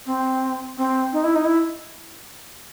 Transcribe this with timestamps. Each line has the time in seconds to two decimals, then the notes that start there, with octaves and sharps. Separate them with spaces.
0.06 C4
0.77 C4
1.13 D#4
1.24 E4
1.35 D#4
1.45 E4